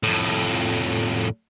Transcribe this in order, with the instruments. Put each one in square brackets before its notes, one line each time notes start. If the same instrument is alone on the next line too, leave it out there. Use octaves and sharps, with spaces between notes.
[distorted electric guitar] F2 A2